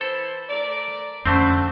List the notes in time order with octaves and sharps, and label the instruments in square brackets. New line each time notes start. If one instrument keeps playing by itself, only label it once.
[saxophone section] E3 E4 C5 [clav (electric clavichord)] A4
[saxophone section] A3 A#4 D5
[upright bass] F2 C#4 [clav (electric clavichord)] D3 A3 C4 [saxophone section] C5